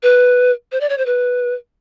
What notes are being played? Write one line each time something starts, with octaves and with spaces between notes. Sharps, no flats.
B4
C5
D5
C#5
C5
B4